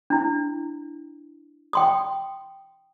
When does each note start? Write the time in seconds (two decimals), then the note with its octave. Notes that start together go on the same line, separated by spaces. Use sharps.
0.10 D4 E4
1.73 G5 C6 D#6